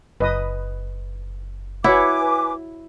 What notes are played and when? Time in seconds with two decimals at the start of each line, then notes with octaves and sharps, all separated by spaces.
0.20 F#1 B4 D#5 D#6
1.84 E4 F#4 B4 C#5 F#5 G#5 D6